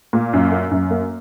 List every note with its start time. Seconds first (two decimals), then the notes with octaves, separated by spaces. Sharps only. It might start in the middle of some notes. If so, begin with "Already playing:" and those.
0.13 A#2
0.33 F#2
0.52 A#3
0.71 F#2
0.90 A#3